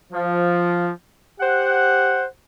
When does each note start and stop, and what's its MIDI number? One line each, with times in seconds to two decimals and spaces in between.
0.13 0.89 53
1.40 2.24 67
1.40 2.24 72
1.40 2.24 78